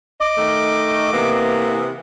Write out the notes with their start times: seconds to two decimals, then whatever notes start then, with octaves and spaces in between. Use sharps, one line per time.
0.21 D#5 D6
0.38 D#3 A3
1.13 C3 E3 A#3 B3